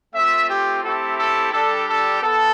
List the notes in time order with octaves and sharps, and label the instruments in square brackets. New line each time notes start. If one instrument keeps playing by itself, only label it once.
[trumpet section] A3 C4 F4 E5
G4
A3 C4 E4 G4 A4
A4
G3 D4 G4 A4
A4
B3 A4